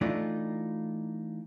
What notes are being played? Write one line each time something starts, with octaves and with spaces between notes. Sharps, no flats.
E3 A3 D4 D#4 F4 D5